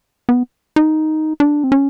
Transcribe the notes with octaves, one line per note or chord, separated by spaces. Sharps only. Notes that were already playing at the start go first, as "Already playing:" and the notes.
B3
D#4
D4
C4
C#4